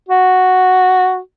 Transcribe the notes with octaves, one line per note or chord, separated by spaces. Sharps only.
F#4